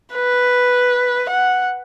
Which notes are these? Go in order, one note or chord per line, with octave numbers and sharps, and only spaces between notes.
B4
F#5